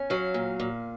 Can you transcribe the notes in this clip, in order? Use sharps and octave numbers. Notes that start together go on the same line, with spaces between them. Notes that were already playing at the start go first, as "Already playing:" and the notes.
Already playing: C#4
F#3 F5
A#2
A#2